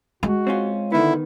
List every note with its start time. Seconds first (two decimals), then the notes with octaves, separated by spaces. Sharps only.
0.23 G#3 F#4
0.47 C4 C#4 F4
0.92 D3 D#3 B3 E4